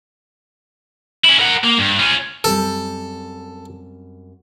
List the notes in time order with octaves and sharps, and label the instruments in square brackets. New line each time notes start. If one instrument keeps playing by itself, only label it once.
[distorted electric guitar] C#4 E4
A#4 F#5
A#3
G2
C#4 F4
[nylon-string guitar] F#2 G3 C4 [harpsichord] A4